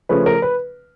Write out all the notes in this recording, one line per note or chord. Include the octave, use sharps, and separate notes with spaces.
C#3 F3 A3 C#4 B4
A#4
B4